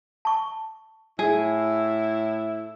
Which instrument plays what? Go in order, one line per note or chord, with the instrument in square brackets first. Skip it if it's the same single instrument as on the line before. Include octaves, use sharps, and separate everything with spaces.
[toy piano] A5 C#6
[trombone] A2 [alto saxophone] E4 [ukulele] G#4